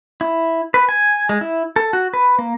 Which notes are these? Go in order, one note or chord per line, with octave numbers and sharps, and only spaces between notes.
E4
B4
G#5
G#3
E4
A4
F#4
B4
A#3